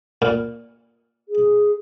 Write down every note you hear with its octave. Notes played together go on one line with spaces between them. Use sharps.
A#2
G#4